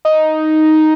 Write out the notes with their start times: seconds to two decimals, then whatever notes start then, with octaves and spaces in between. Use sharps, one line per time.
0.05 D#4